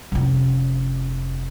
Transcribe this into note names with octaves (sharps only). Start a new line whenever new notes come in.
F1 C#4